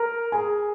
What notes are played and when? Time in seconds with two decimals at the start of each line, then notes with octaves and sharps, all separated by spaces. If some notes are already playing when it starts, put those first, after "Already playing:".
Already playing: A#4 A#5
0.32 G#4 G#5